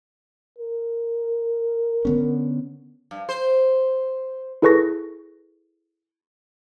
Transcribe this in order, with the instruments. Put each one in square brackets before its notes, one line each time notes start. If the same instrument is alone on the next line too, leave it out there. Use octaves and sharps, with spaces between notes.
[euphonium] A#4
[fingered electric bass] D3 B3 C#4
[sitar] G2
C5
[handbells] E4 G#4 A4 B4 C#6 A#6